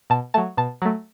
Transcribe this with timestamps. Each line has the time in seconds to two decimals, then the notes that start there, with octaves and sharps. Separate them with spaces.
0.10 B2 A5
0.34 F#3 A3 A5
0.57 B2 A5
0.82 F#3 A3